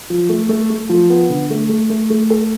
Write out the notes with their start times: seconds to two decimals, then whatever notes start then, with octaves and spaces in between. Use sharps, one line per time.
0.10 F3
0.29 A3
0.49 A3
0.70 A3
0.89 F3
1.10 B3
1.29 D3
1.50 A3
1.69 A3
1.90 A3
2.10 A3
2.30 A4